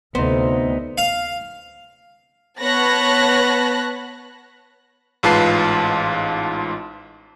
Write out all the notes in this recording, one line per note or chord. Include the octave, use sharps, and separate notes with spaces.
D2 C3 B3 D#4 C5
F5
B3 C#5 A5 B5 F#6 A#6
A1 G#2 F4 B4 A5 C7